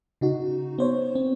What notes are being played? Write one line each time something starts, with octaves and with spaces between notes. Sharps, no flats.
C#3 D#4 F#4
B3 C5 C#5
C4